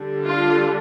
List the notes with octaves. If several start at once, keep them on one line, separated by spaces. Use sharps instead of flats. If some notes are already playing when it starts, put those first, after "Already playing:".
Already playing: D3 G3 D4
F4